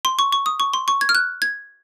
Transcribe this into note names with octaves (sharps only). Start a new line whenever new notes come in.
C6
C#6
C#6
D#6
C#6
C6
C#6
G#6
F6
F#6
G#6